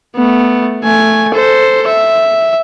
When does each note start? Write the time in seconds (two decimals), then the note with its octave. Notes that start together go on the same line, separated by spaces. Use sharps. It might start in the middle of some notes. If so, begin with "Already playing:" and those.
0.16 A3 B3
0.84 A3 G#5
1.34 A4 C5
1.87 E5